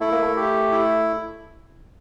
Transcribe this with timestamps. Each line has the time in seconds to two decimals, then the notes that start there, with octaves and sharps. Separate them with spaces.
0.01 A3 E4
0.12 A#3
0.22 A3
0.36 G4
0.71 E4